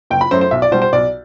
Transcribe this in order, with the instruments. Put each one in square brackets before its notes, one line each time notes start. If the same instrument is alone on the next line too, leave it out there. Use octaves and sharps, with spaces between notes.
[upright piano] F#1 G5
B5
F#2 F#3 A3 C5
C5
B1 E5
D5
B2 G3 C5
C5
B1 D5